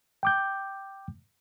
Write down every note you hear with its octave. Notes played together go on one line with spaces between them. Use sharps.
G5 D6 G6